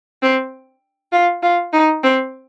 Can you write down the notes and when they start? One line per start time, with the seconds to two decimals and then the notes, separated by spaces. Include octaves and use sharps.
0.22 C4
1.12 F4
1.43 F4
1.73 D#4
2.03 C4